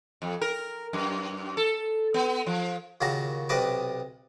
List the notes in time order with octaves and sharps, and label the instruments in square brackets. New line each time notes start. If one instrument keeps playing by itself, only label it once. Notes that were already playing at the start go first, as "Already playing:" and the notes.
[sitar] F2
A#4
F#2
A4
B3
F3
[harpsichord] D#2 A#2 C#3 F#4 A5 A#5
B1 C3 B4 D#5 A5 D6